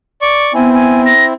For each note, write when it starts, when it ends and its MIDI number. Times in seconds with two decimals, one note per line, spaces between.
0.22 0.53 74
0.22 0.53 85
0.54 1.11 59
0.54 1.33 60
0.54 1.33 64
0.54 0.70 80
0.73 1.02 80
1.05 1.25 94